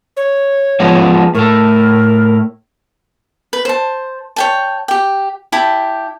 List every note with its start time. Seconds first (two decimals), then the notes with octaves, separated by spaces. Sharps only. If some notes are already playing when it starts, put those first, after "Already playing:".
0.17 C#5
0.80 F3 G#3 B3
1.35 A2 A3 A#4
3.53 B4
3.65 C5 A5
4.36 C#5 G5 A5
4.88 G4 G5
5.52 E4 G4 G5 A5